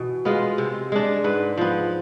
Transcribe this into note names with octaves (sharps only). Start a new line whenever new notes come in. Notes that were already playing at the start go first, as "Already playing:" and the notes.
Already playing: B2 E3 E4
G#3 B3 F4
C3
G#3 D4
G#2 B4
F3 B3